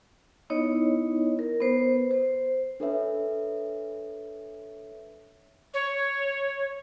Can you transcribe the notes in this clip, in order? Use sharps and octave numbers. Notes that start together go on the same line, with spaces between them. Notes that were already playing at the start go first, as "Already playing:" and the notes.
B3 D#4 E4 C#5 D#5
A#4
B3 B4 C5
C5
D4 A4 B4 C#5 E5
C#5